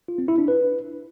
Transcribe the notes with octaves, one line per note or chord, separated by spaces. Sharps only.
F4
C4
E4
D4
B4